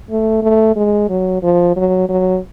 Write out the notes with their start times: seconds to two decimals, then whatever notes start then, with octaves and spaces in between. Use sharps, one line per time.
0.10 A3
0.43 A3
0.76 G#3
1.09 F#3
1.42 F3
1.76 F#3
2.09 F#3